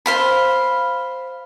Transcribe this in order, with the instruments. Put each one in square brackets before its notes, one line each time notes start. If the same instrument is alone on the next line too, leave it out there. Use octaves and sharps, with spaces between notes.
[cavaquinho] C5 F5 B5